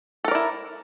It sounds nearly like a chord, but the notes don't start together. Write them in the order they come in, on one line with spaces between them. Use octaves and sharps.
A4 A#4 D5 E4